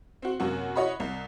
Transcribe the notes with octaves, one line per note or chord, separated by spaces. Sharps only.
C4 F#4
F#2 C3 A#3 F#4
E4 F#4 C#5 D#5 F#5 B5
C2